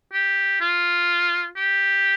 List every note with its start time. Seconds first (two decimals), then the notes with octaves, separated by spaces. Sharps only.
0.13 G4
0.61 F4
1.57 G4